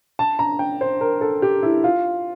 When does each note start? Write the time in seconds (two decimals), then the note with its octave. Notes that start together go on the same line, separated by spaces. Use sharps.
0.19 A5
0.39 A#5
0.59 G5
0.81 C5
1.01 A#4
1.21 A4
1.42 G4
1.63 E4
1.84 F4